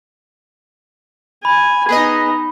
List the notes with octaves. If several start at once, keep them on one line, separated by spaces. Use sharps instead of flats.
G#5 B5
B3 D#4 G#4 B4 D#5